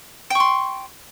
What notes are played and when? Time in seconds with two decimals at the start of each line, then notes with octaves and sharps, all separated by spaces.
0.30 G5
0.35 C#6
0.40 C6